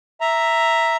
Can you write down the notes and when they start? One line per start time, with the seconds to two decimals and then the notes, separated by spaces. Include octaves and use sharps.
0.21 E5 A#5